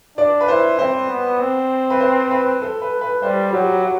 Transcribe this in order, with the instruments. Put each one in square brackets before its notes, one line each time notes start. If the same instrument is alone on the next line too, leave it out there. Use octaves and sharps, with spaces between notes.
[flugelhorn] D4 [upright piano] D5
[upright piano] B4
[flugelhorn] E4 [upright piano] C5
[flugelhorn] C4 [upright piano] C5
[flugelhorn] B3
C4
[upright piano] B4
C5
B4
A4
B4
B4
[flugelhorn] G3 [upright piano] C5
[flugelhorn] F#3 [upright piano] G4
[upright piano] F#4